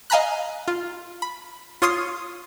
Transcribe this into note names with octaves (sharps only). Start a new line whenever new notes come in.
D#5 F5 G#5 A#5 B5 F#6
F4
B5
F4 C#5 C6 D#6 F6 C7